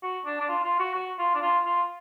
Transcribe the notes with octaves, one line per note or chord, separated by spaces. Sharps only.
F#4
D4
D4
F4
F4
F#4
F#4
F4
D4
F4
F4